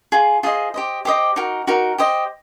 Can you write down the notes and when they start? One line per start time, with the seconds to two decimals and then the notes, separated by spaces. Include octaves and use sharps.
0.12 F4 G#4
0.43 F4 G#4 C5 D#5
0.74 G4 C5 D#5
1.05 G4 C5 D#5 D6
1.36 D#4 F#4 A#4
1.67 D#4 F#4 A#4
1.98 G4 C5 D#5